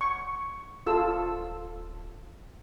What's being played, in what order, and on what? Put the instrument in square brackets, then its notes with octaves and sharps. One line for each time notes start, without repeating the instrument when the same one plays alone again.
[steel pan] C#6
[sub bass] D1 [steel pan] F4 A4 E6